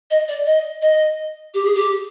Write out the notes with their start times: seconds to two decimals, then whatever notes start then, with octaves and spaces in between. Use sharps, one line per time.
0.11 D#5
0.28 D5
0.46 D#5
0.82 D#5
1.54 G4
1.65 G#4
1.75 G4